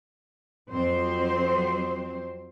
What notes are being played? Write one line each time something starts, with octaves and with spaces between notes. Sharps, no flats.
F2 F#3 C4 C5